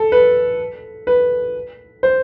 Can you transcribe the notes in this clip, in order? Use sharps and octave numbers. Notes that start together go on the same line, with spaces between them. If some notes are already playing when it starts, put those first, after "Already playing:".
Already playing: A4
B4
B4
C5